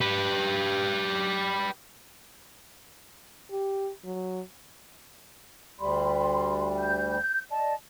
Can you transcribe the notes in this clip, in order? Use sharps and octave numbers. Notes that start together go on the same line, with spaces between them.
G4 B4
G4
F#3
D2 G3 B5 C6
G6
D5 D#5 A5